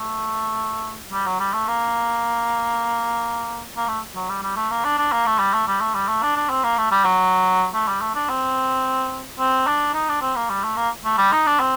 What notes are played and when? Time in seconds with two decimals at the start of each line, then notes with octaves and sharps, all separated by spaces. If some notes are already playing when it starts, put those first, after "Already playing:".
Already playing: A3
1.12 G3
1.26 F#3
1.40 G3
1.54 A3
1.67 A#3
3.76 A#3
3.87 A3
4.15 F#3
4.29 G3
4.43 G3
4.56 A3
4.70 A#3
4.85 D4
4.98 D4
5.12 A#3
5.26 A3
5.39 G3
5.53 A3
5.67 G3
5.81 A3
5.94 G3
6.08 A3
6.22 D4
6.36 D4
6.49 C4
6.63 A#3
6.77 A3
6.91 G3
7.05 F#3
7.74 A3
7.87 G3
8.01 A3
8.15 D4
8.29 C4
9.39 C4
9.66 D4
9.94 D#4
10.08 D4
10.22 C4
10.36 A#3
10.49 G3
10.64 A3
10.76 A#3
11.05 A3
11.18 G3
11.32 D#4
11.46 D4
11.60 C4